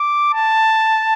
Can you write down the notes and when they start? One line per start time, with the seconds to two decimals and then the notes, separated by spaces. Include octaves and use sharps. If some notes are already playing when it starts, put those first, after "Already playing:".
Already playing: D6
0.33 A5